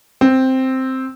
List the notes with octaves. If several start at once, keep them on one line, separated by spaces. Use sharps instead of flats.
C4